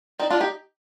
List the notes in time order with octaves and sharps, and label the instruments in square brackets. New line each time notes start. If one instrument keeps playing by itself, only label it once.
[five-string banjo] C4 D#4 [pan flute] D5
[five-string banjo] D4 F4 [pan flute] D5
[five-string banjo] D#4 G4